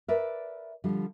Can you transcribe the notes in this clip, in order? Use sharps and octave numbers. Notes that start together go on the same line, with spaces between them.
A#4 B4 D5 E5
D3 F3 G3